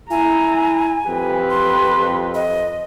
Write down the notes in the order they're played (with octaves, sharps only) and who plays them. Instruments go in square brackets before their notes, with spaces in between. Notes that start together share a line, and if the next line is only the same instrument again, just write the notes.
[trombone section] E4 [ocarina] G#5 [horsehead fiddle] A#5
[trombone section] F2 [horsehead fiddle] G4 B4
[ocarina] C6
D#5